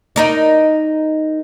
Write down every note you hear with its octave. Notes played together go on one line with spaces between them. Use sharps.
D#4 A#4 D5